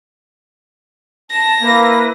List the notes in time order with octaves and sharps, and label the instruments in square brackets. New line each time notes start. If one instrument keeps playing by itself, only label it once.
[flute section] A5 [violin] A#6
[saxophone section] A#3 [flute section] E4 B4